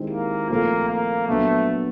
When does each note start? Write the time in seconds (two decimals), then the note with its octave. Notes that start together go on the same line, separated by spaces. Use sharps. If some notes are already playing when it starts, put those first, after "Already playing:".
Already playing: D#3 G#3 C4 E4 G4
0.10 A#3
0.49 A#2 F3 A3 A#3 C4 F4
0.88 A#3
1.27 A#2 F#3 A3 B3 D4